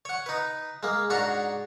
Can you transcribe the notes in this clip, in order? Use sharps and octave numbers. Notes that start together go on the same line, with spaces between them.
C#5 F#5
D#4 B4
G#3 A#3
G#2 D4 F#4 C#5 F#5 A#5